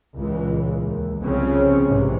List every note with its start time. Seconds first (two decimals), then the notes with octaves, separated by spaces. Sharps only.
0.17 C#2 A#2 E3 G#3
0.81 D#2
1.22 C2 C#3 F3 C4 C#4
1.87 A#1 G#2 C3 E3